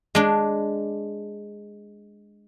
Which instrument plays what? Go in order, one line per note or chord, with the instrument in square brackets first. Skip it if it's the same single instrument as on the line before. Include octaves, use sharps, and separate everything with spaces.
[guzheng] G#3 D4